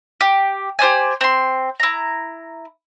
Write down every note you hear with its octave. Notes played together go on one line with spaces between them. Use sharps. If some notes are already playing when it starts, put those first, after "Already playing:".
G4
G4 C5 D5 G#5
C4 C6
E4 A#5